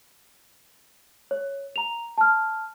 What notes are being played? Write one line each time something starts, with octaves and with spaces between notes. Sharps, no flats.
C#5
A#5 F7
A5 F6